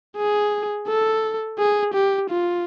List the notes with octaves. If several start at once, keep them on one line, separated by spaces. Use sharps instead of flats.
G#4
A4
G#4
G4
F4